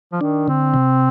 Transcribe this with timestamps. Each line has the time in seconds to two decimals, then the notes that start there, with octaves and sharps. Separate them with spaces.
0.12 F3
0.21 D#3 D4
0.48 D3 C4
0.74 C3